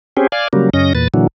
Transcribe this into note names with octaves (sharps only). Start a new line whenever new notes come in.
C4 C#4 G4 G#4
D5 F5 G#5
C#3 F#3 G3 A#3
F#2 C#3 C#4 D#5 A#6
E2 A#2 B4 A6
A#2 D3 E3 F#3